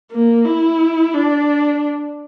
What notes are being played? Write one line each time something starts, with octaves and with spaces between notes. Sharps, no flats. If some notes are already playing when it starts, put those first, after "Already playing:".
A#3
E4
D4